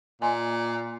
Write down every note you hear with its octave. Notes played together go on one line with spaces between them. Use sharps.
A#2 D#5 G#5 C6